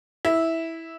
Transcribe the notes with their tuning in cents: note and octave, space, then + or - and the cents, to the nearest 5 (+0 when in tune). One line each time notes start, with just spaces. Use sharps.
E4 -10